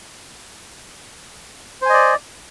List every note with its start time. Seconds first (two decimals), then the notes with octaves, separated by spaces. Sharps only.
1.82 C5
1.86 G#5
1.90 D#5
1.93 D5